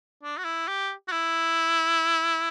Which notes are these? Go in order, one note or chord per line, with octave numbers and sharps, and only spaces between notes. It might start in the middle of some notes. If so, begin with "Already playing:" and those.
D4
F#4
E4
G4
F#4
E4